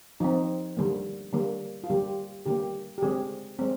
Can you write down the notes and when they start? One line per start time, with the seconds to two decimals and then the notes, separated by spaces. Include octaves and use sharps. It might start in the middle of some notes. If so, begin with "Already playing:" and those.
0.20 F3 C4 D#4
0.77 D3 G3 A#3
1.33 D3 G3 A#3
1.84 F4
1.90 D3 G3 A#3 G4
2.46 D3 G3 A#3 G4
2.98 G4
3.02 D3 G#3 C4 G#4
3.59 G#3 C4